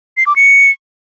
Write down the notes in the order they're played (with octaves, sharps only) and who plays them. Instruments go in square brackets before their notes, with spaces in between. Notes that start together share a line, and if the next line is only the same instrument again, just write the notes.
[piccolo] C7
D6
C#7